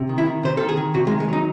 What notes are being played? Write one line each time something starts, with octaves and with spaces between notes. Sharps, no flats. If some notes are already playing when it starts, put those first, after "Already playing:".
Already playing: C3
D#3
E4
D#3
C3 C5
D#3 A4
G#4
D#3
C3 F#4
G#3
D#3
G#3
F#3 D#4